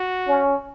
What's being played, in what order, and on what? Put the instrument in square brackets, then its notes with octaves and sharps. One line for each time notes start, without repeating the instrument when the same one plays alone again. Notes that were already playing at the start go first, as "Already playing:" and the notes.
Already playing: [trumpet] F#4
[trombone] C#4